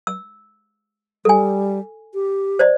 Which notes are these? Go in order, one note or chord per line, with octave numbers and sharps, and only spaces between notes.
E6
G3 A4 G#5
G4
C5 D5 D#5